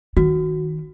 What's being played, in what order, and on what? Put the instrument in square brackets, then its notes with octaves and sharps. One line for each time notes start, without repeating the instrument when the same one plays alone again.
[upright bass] D#3 [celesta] F#4